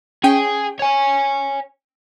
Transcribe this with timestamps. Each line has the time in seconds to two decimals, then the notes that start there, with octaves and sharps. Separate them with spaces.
0.24 C#4 G#4 G5
0.79 C#5 G#5